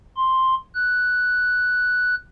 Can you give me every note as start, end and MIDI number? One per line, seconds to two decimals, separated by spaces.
0.16 0.55 84
0.75 2.15 90